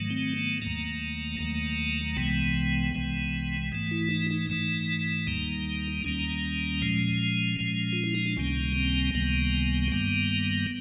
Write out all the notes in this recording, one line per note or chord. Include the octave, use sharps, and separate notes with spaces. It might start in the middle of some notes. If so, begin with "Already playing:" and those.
Already playing: G#2 D#3 F#3 A3
C4
B3
D#2 D#3 F#3 A3 A#3
D#2 D#3 F#3 A3
C2 C3 E3 G#3 B3
C2 C3 E3 G#3
G#2 E3 A3
E4
D#4
D#4
G#2 E3 A3
D#2 D#3 G3 A#3
D#2 D#3 G3 A#3 C#4
A#2 F3 G#3
A#2 F3 G#3
F4
E4
D#4
D4
C#2 C3 D#3 G3 A#3 C#4
C4
C#2 C3 D#3 G3 A#3 B3
G2 D#3 G3 A#3